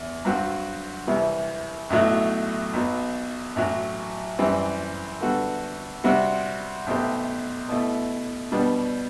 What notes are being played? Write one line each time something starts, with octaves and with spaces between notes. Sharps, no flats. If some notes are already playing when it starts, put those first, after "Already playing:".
Already playing: E2
G2 F#3 C4 F#4
C2 C3 E3 G3
B1 A2 F#3 A3 E4
B1 B2 F#3
A1 A2 F#3
F#2 E3 G3 C4
D3 G3 B3 F#4 A4
C3 G3 C4 F#4
B1 B2 A3 C4 G4
B2 A3 E4
B2 G3 B3 D4